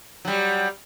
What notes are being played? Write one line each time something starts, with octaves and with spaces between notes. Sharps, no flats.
F#3 G3